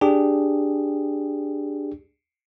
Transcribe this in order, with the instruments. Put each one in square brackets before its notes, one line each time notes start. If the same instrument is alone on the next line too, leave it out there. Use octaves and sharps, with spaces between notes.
[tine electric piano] D4 G4 G#4